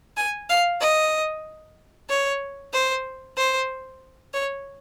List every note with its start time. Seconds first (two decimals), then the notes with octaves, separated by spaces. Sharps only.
0.17 G#5
0.49 F5
0.81 D#5
2.09 C#5
2.73 C5
3.37 C5
4.34 C#5